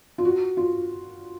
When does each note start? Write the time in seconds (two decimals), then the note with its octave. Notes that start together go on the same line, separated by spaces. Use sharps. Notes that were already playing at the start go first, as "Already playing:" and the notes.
0.18 F4
0.25 F#4
0.57 F4